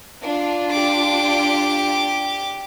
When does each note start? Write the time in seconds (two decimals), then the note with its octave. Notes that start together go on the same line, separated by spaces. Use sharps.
0.21 D4 F4
0.71 G4 D6